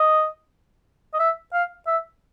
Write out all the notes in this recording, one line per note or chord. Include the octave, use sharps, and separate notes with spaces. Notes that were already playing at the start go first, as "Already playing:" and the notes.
Already playing: D#5
D#5
E5
F5
E5